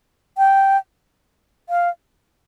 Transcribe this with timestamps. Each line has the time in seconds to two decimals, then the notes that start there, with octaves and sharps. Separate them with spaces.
0.38 G5
1.69 F5